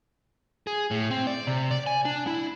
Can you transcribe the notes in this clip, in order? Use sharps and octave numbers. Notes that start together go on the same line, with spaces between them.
G#4
A2
C4
D5
C3
D5
G#5
D4
E4